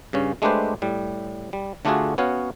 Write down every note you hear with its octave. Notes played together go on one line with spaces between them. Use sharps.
G2 C#3 C#4
G#3 A3 D4 G4 B4 C5
A2 G3
G3
D3 A3 D4 F4 F#4 G#4
B3 C#4 F#4 C#5 F5